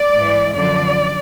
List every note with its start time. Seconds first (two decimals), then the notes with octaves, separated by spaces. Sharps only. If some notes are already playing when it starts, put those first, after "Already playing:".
Already playing: D5
0.13 G#2 E3
0.53 F#2 D3 F3 D5